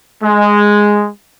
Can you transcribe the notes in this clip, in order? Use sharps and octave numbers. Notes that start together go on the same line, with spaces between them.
G#3